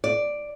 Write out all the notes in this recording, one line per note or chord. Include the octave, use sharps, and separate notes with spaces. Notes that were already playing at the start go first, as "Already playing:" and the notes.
D5